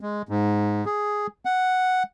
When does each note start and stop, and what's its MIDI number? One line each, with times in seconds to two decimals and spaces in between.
0.01 0.22 56
0.29 0.84 44
0.86 1.27 68
1.45 2.03 78